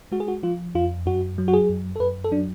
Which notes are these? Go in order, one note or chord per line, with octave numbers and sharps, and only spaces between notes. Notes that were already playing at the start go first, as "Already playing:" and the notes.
G#3 F#4
G#4
F#4
F3 F4
F2 F4
F#2 F#4
F#3
F#4
G#4
F#2
A4
F#2 B4
A4
F#3 D4